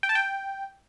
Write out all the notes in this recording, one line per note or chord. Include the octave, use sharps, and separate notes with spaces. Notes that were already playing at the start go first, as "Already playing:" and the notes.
G5
A5
G5